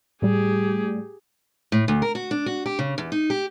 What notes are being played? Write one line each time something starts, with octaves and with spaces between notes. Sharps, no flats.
A2 G3 G4 G#4
A2
D2
A#4
F#4
D4
F#4
G4
C#3
E2
D#4
G4